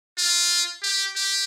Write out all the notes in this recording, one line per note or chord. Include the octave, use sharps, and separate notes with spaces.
F4
G4
G4